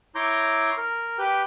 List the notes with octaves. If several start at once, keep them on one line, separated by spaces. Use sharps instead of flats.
E4 C#5 A#5 C6 D6 G6
A#4
G4 B4 G5